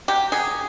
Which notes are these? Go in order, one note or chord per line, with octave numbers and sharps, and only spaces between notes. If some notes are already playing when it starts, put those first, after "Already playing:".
F#3 G4
F#3 G#4